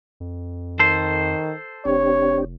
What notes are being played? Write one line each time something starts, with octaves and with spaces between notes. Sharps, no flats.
F2
D#3 A4 C5
F1 C4 D4 G4 C#5